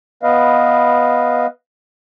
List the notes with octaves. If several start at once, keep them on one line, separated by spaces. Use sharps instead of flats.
B3 B4 D#5 F5